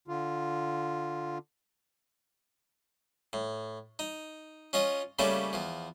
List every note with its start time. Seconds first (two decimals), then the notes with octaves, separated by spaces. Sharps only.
0.08 D3 F4
3.33 A2
3.99 D#4
4.73 C#4 F4 C#5 D#5
5.19 C#3 G3 A3 A#3 C#4 A4
5.53 E2 F3